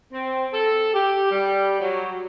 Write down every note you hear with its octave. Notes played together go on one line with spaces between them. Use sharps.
C4
A4
G4
G3
F#3